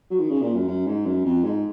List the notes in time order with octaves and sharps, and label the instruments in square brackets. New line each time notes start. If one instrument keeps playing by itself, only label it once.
[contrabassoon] F#3
D#3
C#3
A#2
F#2
F#2
G#2
F#2
F2
G#2